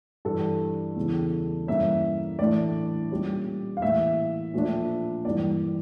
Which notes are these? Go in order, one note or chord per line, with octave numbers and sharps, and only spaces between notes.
G2 E3 G3 D4 A4
E2 C#3 E3
G2 E3 A#3 C#4 E5
A2 E3 A3 D4 D5
A#2 G3 C#4
F5
A2 E3 A#3 E5
A#2 F3 A3 D4
G2 E3 A#3 D5